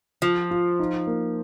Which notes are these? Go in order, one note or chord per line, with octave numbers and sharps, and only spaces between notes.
F3 F4
F4
D#4
A#3